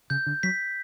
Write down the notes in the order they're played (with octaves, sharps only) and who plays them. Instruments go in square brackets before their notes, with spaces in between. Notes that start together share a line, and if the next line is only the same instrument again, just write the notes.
[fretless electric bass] C#3 [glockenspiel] G6
[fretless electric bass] D3
[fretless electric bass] F#3 [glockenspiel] B6